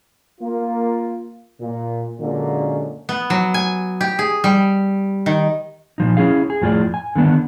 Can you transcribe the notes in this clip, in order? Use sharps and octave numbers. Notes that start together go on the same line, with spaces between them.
A#3 F4
A#2
F#2 A#2 D3 G#3 A#3 C#4
B3
F#3
G#5
G4
G#4
G3
D#3
A#2 F3 D#4
C#4 E4 G#4 F5
G#4
F2 A2 F4 G#4 D5
G#5
D3 D#3 B3 D4